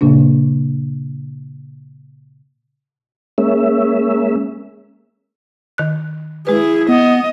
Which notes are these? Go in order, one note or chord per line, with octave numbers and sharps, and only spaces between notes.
A#2 C#3 A#3 D4
G#3 A#3 C#4 E5
D#3 F#6
G#3 E4 G#4 B4
B3 D#5